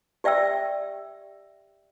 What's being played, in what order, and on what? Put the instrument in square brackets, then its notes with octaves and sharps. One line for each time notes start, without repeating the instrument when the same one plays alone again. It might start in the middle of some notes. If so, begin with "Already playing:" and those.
[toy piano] G4 D5 E5 G5 E6